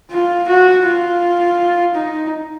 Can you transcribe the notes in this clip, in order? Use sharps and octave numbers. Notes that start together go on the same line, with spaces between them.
F4
F#4
F4
D#4